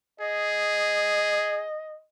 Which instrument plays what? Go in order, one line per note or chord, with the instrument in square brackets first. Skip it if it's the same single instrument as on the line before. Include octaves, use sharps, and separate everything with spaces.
[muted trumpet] G#4 [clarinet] D#5